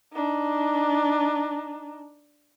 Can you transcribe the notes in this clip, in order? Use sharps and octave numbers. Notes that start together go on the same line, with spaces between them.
D4 D#4